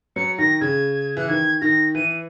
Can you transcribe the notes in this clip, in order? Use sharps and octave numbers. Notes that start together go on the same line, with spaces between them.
F#3 C#7
D#3 A#6
C#3 G#6
E3 F#6
D#3 G#6
D#3 A#6
E3 D#7